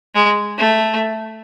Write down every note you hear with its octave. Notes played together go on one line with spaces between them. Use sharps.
G#3
A3